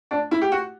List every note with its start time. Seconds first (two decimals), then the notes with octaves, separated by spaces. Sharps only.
0.11 D4
0.31 E4
0.41 G4
0.52 F#4